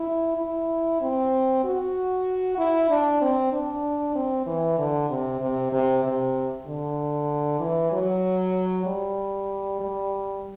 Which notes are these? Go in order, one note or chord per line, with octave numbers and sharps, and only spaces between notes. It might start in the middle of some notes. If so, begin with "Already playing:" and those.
Already playing: E4
E4
C4
F#4
E4
D4
C4
D4
C4
E3
D3
C3
C3
C3
C3
D3
E3
F#3
G3
G3